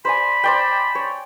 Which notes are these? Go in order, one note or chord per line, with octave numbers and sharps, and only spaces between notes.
C5 D5 G#5 B5
C5 D5 G5
C#5